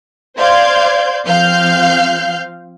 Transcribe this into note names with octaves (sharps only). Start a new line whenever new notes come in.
C5 D5 F5 C6 G6 G#6
F3 C4 F5 F6 G6 C7